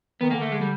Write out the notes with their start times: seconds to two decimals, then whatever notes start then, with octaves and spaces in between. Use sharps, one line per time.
0.21 D#3 B3
0.31 D3 A#3
0.41 A3
0.52 G#3
0.61 G3